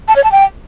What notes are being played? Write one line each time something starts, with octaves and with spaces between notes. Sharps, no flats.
A5
C#5
A5
G5